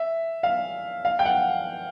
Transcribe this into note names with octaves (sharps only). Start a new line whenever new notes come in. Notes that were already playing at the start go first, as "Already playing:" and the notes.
Already playing: E5
F5
F5
G5
F#5